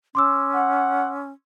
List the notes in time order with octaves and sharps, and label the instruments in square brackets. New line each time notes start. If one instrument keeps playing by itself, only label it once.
[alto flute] C#4 [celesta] C6 D6 E6
[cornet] F#5